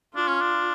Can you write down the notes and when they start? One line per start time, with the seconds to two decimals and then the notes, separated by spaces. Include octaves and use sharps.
0.16 D4 F4
0.28 C#4
0.41 D4